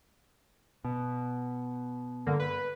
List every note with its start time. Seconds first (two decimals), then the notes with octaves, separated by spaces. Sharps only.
0.85 B2
2.26 G2 D3 A#3
2.39 B4